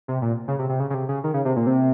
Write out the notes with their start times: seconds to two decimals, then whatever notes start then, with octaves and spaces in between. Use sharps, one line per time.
0.08 C3
0.22 A#2
0.48 C#3
0.59 C3
0.69 C3
0.80 C#3
0.90 C#3
0.94 C3
1.09 C#3
1.24 D#3
1.34 C#3
1.45 C3
1.56 A#2
1.67 C3